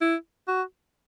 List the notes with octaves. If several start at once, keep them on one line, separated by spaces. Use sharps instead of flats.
E4
F#4